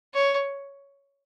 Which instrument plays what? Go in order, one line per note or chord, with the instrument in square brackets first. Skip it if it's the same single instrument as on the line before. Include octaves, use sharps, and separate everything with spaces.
[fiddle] C#5